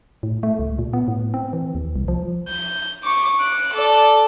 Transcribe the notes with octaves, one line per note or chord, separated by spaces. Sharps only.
A2
A3
C#2
A#2
B3
A2
C4
E3
D#2
C2
F3
G6
C#6 D6
F#6 D7
A4 D5